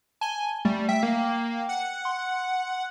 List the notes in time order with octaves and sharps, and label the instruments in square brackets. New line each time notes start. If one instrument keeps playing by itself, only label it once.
[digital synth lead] G#5 [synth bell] A5 G7
[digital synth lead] G3 [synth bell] A3
[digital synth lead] E5 [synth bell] G5
[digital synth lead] A#3
F#5
[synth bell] C6